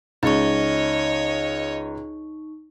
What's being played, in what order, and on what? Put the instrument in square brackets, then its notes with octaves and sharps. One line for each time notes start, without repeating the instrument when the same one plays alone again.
[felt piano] C#2 [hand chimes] D#4 C#6 [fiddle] C#5 D#5